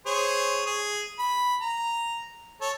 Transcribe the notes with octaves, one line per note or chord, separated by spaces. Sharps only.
G#4 C5 C#5
G#4
B5
A#5
A4 C#5